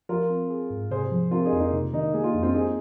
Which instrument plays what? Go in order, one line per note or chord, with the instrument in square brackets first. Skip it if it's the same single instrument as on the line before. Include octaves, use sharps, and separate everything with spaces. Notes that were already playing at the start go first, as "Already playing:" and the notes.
[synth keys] F3 [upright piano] F4 A#4
[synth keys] C4
G#4
G#2
[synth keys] C3 [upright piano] G#4 C5
[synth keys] F3
[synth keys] C4 [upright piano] F4 A#4
[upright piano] D#4 G#4
[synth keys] F2
[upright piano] A#3 D#4
[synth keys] C3
[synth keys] D#3 [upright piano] A#3 D#4
[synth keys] A#3 [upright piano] G#4
[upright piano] F4
[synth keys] F2 [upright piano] D#4
[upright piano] C4 F4
[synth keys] A#3 [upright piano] D#4 G#4